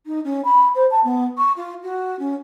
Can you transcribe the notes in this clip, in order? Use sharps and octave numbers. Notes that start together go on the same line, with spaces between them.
D#4
C#4
B5
C5
A5
B3
C#6
F4
F#4
C#4